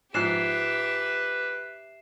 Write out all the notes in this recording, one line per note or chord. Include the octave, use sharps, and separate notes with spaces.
G#2 F3 G4 B4 E5 F#6 C7 E7